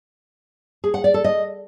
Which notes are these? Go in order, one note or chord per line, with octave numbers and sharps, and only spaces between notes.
G#4
F#5
D5
A4
D#5